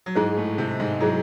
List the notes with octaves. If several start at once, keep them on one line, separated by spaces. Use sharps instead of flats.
F#3
G#2 G#3 E4 G#4 C5
A2 A3
C3 C4
G#2 G#3
F#3 E4 G#4 C5